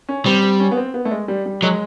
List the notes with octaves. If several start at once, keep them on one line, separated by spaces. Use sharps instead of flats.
C#4
G3 C4
C4
C#4
B3
C4
B3
A3
G#3
G3
G3
F#3 G#3